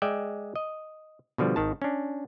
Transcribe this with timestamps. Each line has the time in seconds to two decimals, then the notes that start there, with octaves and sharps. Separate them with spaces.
0.02 G#3 D5 E5 G5
0.56 D#5
1.38 B2 D3 F3 G3
1.56 G#1 D#3 A5
1.82 C#4 D4